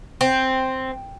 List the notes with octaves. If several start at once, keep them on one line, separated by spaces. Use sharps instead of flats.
C4